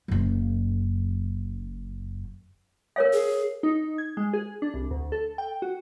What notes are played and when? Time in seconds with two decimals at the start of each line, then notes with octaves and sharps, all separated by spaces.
0.08 F#1 F#2
2.96 A#4 C#5 F5
3.13 G#4
3.63 D#4
3.98 G#6
4.17 G#3
4.33 G#4
4.62 D4
4.74 C2
4.91 D2
5.12 A4
5.38 G5
5.62 F#4